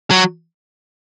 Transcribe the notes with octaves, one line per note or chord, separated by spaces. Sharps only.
F#3